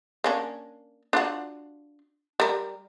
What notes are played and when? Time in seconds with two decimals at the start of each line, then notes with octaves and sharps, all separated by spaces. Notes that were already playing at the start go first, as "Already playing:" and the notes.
0.24 A#3 C#4 D4
1.13 D4 F4 F#4
2.40 G3 A#4